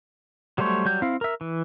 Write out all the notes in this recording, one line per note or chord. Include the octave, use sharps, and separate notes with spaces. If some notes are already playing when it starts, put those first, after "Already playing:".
F#3 G3 A3 C5 C#5
F#3 G3 G6
C4 E4 F5
A#4 E5
E3